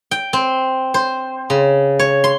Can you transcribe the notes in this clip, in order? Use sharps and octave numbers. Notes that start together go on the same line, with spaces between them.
G5
C4
C5
C#3
C#5
C6